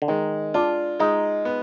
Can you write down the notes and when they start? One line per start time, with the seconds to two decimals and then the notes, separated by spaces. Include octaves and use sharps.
0.02 D3
0.08 D#3 G#3
0.54 D4 F4
1.00 G#3 D#4
1.45 B3